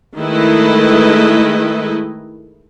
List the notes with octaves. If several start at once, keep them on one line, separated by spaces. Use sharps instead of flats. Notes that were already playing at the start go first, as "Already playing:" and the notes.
D#3 G#3 A3 E4 B4 D#5